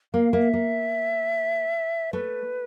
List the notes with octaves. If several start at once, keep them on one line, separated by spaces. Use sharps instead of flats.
A#3 F5
A#3 E5
A#3
A3 B4